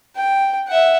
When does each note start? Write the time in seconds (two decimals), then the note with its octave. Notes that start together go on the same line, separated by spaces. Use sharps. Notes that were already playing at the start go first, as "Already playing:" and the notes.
0.16 G5
0.68 E5 F#5